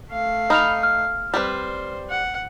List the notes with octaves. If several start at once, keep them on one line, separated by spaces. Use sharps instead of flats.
A3 F5
D#4 B5 F6 F7
F6
G3 C4 B4 C5
F#5